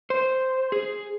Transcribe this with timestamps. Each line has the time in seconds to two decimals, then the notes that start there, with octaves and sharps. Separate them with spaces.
0.10 C5
0.72 G#4